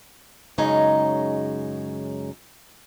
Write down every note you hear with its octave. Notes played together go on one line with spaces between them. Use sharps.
F#2 C#3 G#3 D#4 C#5